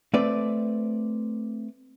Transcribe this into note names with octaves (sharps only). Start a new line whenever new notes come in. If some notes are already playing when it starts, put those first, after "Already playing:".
A3 C4 B4 D5